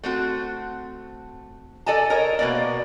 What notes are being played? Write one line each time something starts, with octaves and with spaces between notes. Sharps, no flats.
A3 C4 F#4
A4 D5 D#5 G#5 A5
A#4 C#5 D#5
B2 A#3 D5